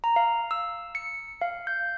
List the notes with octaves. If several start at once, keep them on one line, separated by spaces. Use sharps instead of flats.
A#5
F5
E6
C#7
F5
G6